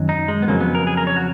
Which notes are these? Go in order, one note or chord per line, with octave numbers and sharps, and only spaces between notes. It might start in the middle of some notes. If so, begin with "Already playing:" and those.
Already playing: F#2 D#3 F#3
D#4
G#3
B3
F2 C#3 F#3 A#3
B3
A#4
G#4
A#4
C#5
F#4